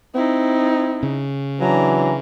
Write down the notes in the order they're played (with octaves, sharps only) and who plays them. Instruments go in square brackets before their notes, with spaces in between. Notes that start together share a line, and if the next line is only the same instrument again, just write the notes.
[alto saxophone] C4 [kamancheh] D#4 E4
[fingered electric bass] C#3
[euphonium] E3 [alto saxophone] F#3 [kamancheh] D4 A#5